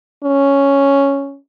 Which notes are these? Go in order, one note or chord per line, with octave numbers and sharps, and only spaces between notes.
C#4